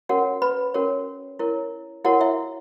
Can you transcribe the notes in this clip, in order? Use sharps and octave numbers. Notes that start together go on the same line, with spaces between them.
C#4 F#4 A#4 C#5 F#5
B4 B5
C#4 F#4 A#4 C#5
E4 A#4 C#5
E4 F#4 A#4 C#5 F#5
E4 E5